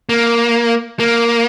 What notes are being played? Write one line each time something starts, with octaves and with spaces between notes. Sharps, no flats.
A#3
A#3